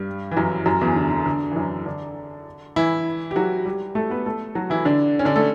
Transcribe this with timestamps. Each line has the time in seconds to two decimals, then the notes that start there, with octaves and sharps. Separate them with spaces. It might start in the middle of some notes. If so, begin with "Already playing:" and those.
Already playing: G2 G3
0.31 E3
0.37 F#2 F#3
0.66 F#2 F#3
0.81 E2 E3
0.96 D3
1.11 D3
1.26 D3
1.52 E3
1.56 F#2 F#3
1.86 D3 D4
2.76 E3 E4
3.31 G4
3.36 F#3 F#4
3.65 G3 G4
3.95 A3 A4
4.10 B3 B4
4.26 A3 A4
4.55 F#3 F#4
4.70 E3 E4
4.85 D3 D4
5.19 C#4
5.25 D3 D4
5.36 A3 A4